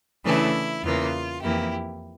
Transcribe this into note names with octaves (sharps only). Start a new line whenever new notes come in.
C#3 E3 A3 D4 E4
E2 C#3 E3 A#3 F4
F2 E3 A#3 E4 G4